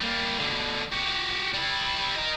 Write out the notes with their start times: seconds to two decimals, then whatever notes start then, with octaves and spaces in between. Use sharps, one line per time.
0.01 G3 A#3
0.39 B2 D3
0.92 F#4 G4
1.54 G3 E4
2.16 A#4 D#5